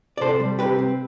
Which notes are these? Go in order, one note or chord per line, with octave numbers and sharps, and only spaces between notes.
D5
C3 A4 C5
G3
C3 G4 B4
C4